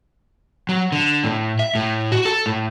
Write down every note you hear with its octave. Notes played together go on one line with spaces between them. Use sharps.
F#3
D3
A2
E5
A2
F#4
A4
A2